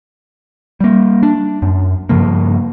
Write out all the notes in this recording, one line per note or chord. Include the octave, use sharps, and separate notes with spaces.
G3 A#3
D4
F#2
G2 C#3 F3 A#3